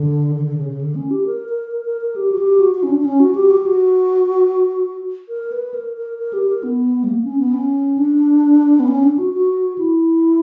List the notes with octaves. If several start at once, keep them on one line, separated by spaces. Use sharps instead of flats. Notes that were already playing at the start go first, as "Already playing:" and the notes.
Already playing: D3
D3
D3
C#3
C#3
D3
C#4
G4
A#4
A#4
A#4
A#4
A#4
G4
F#4
G4
F#4
F#4
C#4
D4
D4
C#4
F#4
G4
F#4
G4
F#4
A#4
B4
A#4
A#4
A#4
G4
A#4
B3
G3
A#3
C#4
B3
C#4
D4
B3
C#4
D4
F#4
F#4
E4